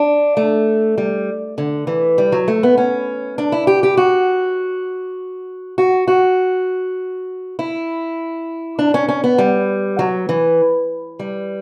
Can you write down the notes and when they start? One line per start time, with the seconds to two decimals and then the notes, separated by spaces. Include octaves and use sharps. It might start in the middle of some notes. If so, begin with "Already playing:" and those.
Already playing: D4
0.37 A3
0.98 G3
1.58 D3
1.87 E3
2.18 G3
2.32 F#3
2.48 A3
2.63 B3
2.78 C#4
3.38 D4
3.52 E4
3.67 G4
3.83 G4
3.97 F#4
5.78 F#4
6.08 F#4
7.59 E4
8.79 D4
8.94 C#4
9.08 C#4
9.24 B3
9.38 G3
9.99 F#3
10.29 E3
11.19 G3